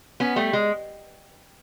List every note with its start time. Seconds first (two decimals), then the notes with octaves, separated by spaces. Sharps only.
0.20 B3 C#4
0.36 G3 A3
0.53 G#3